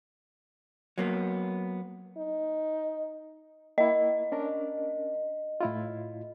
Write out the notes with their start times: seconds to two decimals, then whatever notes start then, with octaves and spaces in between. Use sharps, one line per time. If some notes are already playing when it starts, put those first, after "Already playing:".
0.98 F#3 A#3 B3
2.17 D#4
3.78 A#3 E4 D#5
4.32 C#4 D4 A#4
5.61 A2 E4 F4